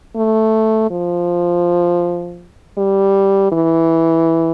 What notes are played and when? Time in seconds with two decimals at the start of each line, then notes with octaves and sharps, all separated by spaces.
0.16 A3
0.90 F3
2.78 G3
3.52 E3